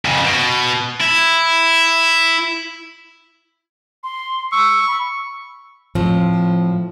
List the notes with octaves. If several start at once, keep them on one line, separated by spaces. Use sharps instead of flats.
F2 C#3
B2
E4
C6
C#6 E6
B5
A2 F3 C4